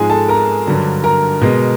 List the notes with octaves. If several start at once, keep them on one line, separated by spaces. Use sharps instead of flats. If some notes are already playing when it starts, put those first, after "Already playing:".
Already playing: G#2 F3 G#3 G#4 G#5
A4 A5
A#4 A#5
G2 D3 F#3
A#4 A#5
B2 G#3